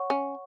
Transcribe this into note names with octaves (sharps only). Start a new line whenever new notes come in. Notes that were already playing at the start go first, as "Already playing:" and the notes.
Already playing: C#5 F#5 C#6
C#4